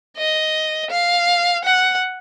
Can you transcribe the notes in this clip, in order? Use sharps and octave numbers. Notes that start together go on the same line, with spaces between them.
D#5
F5
F#5